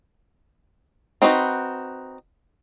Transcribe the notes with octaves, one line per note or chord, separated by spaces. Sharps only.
C4 D#4 F#4 B4